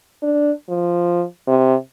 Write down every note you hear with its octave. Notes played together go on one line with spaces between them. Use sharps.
D4
F3
C3